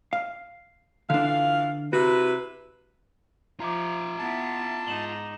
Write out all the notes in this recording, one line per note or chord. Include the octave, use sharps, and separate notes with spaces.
F5
D3 E3 D4 F4 F5
C3 E4 F#4 B4
F3 F4 E5 A#5 D6
B3 E4 A5
G#2 D#4 E7 F#7 G7